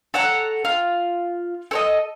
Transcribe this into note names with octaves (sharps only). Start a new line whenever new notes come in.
A4 C#5 F#5 A#5
F4
A4 C#5 D#5